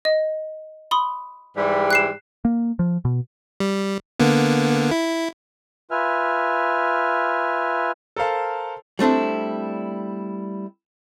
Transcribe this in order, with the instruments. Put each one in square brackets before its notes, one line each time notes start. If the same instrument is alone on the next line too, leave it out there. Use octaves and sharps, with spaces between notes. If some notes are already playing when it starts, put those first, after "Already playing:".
[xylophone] D#5
B5 C6 D#6
[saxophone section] G#2 E3 G3
[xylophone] F#6 C7 E7
[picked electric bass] A#3
F3
B2
[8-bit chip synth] G3
D3 A#3 B3
E4
[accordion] F4 B4 E5 G#5 F6
[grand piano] A4 A#4 C5 F5 A5
[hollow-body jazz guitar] G3 A3 C4 D4 E4